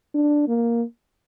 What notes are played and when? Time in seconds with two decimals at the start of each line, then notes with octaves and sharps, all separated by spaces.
0.15 D4
0.48 A#3